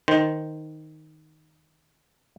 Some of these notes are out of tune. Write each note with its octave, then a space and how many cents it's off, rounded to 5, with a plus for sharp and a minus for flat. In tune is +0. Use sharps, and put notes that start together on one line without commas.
D#3 +0 C5 +0